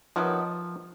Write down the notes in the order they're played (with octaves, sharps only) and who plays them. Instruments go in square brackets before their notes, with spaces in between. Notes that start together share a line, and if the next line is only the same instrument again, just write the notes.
[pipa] C3 D#3 F#3 B3 [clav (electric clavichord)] F3